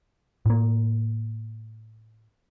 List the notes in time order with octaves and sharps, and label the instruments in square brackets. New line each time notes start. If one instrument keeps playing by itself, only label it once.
[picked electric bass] A2 A#3